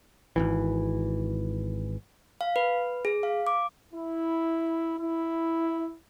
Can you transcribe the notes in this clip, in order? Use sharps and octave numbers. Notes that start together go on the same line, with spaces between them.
G#1 C#2 E3
F5
B4
G#4
F5
D6
E4
E4